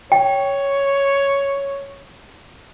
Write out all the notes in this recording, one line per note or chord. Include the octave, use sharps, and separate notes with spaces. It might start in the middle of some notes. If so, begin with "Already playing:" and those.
C#5 G5